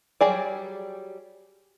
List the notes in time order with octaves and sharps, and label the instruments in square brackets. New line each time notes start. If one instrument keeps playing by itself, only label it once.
[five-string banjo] F#3 G3 G#4 D5